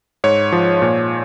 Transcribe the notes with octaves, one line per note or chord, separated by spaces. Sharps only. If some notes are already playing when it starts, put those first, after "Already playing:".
G#2 C#5
F3
A#2